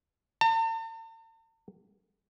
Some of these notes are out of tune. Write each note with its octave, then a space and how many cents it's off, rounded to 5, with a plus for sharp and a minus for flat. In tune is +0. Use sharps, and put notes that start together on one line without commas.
A5 +45